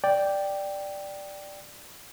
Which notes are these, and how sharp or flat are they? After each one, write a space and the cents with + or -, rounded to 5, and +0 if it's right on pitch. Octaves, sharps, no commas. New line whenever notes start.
D5 +0 G5 +0